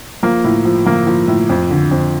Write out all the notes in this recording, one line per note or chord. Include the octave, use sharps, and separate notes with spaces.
F3 A#3
A2
F3
F3 A#3
F3
A2
F2
D3
F2